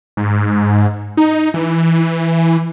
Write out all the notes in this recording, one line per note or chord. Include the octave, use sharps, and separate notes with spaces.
G#2
D#4
E3